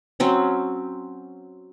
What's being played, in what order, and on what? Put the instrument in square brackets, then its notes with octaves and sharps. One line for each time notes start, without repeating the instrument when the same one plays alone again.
[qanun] F#3 C4 C#4